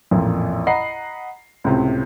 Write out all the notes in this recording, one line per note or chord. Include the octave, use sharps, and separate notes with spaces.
A1 F2 A#2
D#5 F#5 A#5 B5 C7
C#2 A2 C3